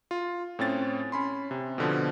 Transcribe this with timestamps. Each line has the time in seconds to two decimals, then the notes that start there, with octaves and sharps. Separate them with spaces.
0.11 F4
0.59 A2 C4 C#4 A6
1.12 C#4 B5 C6
1.51 C3
1.78 B2 D3 F3